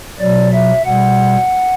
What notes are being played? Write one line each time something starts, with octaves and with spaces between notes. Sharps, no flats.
B2 F#3 D5
E5
B2 G3 F#5